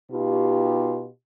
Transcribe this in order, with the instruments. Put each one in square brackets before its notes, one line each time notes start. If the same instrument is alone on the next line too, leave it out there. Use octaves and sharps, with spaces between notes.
[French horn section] B2 D#4 F4 G4